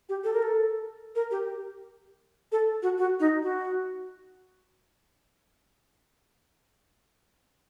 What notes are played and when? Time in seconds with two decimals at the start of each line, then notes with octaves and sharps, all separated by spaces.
0.09 G4
0.24 A4
0.33 A#4
0.43 A4
1.15 A#4
1.31 G4
2.52 A4
2.82 F#4
2.98 F#4
3.20 D#4
3.42 F#4